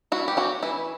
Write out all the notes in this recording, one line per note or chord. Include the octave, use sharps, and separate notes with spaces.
E4 F#4
G4
C#4 F#4
E3 E4